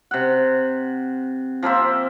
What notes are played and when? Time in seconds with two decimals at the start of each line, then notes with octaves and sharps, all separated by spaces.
0.11 C3 F#5
1.63 F3 A#3 C4 E5